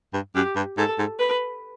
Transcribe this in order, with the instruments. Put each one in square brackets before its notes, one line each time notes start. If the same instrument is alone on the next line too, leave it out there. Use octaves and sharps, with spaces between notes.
[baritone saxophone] G2
[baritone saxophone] F#2 [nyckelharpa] G4
[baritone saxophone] G2
[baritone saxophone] G#2 [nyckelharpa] A4
[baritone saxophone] G#2
[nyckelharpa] B4